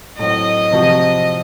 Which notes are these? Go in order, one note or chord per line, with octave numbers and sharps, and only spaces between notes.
A2 F#3 C4 D#5
C3 F3 C4 F#4